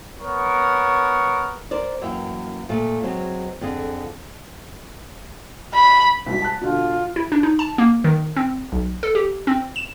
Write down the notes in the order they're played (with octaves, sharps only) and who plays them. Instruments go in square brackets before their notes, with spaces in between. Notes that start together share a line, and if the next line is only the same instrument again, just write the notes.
[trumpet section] B3 A#4 C#5 C#6
[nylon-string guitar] A#4 C5 D5
F#2 E3 A#3 E5 G5
A#2 A3
F#3 G#3 B3 C4
F2 D3 G#4
[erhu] B5
[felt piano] C2 G#2 B2 [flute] B6
[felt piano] A5 F#6
[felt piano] B2 D3 [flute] F4
[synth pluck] E4
D4
D#4
A5
A#3
D#3
C4
B1
A4
G4
C4
E7